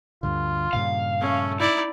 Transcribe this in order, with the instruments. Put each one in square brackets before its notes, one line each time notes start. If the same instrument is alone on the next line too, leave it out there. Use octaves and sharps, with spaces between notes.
[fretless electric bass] D2 G2 D3 [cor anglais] F4
[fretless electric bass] G2 A#2 C#3 [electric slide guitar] F5
[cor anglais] A3 [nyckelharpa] C#4
[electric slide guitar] D#4 [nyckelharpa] E4 D5 [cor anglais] E5